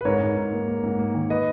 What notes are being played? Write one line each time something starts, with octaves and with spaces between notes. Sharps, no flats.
B4
G#2 A#4 C#5
G#2
G#2
A#3
A#3
G#2
A#3
D#3
B4 D#5